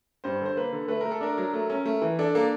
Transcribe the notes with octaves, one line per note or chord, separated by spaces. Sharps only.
G2 C5
D3 C5
A#3 B4
D3
A3 B4
A3 A#4
A4
D4 A#4
F#3
A3
C#4
A3
E3
D4 A4
A#3 A4